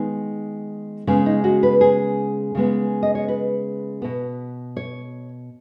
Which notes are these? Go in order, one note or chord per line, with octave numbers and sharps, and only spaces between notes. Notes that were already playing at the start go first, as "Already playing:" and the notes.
Already playing: D#3 G#3 B3
C#3 G#3 B3 C#4
D#4
F#4
B4
G#4
C#3 G#3 B3
D#5
C#5
B4
B2 B3
C#5